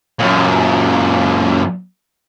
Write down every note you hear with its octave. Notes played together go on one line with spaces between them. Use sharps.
F#2 A#2